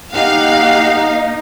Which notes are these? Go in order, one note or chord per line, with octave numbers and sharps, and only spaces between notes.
A#3 D#4 G4 F5 F#5